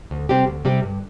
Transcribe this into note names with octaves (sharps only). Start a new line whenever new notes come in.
D2
C3 G3 C4 G4
D2
C3 G3 C4 G4
G2